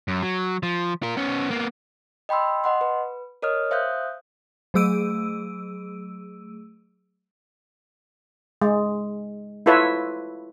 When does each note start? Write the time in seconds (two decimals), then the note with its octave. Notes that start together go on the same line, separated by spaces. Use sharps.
0.08 F#2
0.23 F#3
0.63 F3
1.03 F4 A#4
1.17 B3 C#4
1.51 A#3 B3
2.29 D#5 G5 B5 C6 E6
2.64 D#5 F#5 C6
2.81 B4
3.42 A#4 C#5 D#5 D#6 F6
3.71 C5 E5 F5 D#6 F#6 G6
4.74 F#3 A3 G#4 E6 D7 D#7
8.62 G#3
9.66 E4 F4 A4 B4 C#5 E5